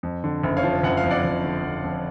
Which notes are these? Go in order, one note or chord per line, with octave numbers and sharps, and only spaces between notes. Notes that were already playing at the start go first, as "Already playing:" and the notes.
F2
D3
F#1
C#5 F5
F3
F#1 F#5
F5
F2
D5 F#5
F#1
D3
F2
F2